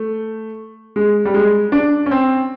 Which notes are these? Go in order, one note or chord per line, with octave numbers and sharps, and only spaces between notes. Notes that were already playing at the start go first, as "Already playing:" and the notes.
Already playing: A3
G#3
G3
G#3
D4
C#4
C4